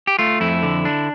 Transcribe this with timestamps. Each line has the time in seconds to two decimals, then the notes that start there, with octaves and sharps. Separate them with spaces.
0.07 G4
0.19 A3 F4
0.41 F2 E4
0.63 D3
0.85 D4